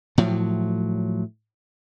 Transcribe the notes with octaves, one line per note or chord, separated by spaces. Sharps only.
A2 F3 F#3